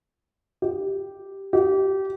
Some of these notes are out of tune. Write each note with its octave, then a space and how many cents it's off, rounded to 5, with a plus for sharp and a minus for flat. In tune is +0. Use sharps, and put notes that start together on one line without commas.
G4 -5
G4 -25